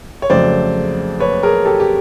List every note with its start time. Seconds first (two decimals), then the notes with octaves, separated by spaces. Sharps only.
0.22 C#5
0.30 F2 C#3 F#3 A3 C5 D5
1.20 B4 C#5
1.43 G#4 A#4
1.65 G4 A4
1.80 G4